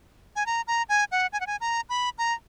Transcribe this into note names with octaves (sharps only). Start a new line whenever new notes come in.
G#5
A#5
A#5
G#5
F#5
G#5
F#5
G#5
A#5
B5
A#5